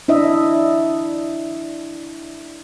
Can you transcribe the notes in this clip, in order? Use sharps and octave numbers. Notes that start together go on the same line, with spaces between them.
D4 E4 D#5 E5